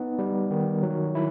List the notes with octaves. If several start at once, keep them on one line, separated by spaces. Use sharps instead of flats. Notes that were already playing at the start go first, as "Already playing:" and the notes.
Already playing: B3 D#4
G3
D#3
F#3
E4